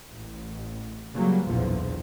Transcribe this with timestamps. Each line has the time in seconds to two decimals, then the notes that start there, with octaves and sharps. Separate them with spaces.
0.11 A1
1.15 C#3 F#3 G3 A#3
1.46 F#1 B1 E2 A#2 D3 F3